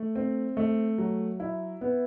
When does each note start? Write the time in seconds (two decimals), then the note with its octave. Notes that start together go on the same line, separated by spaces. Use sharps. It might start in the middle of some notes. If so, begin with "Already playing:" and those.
Already playing: A3
0.16 C4
0.57 A3
0.98 F#3
1.40 E4
1.81 B3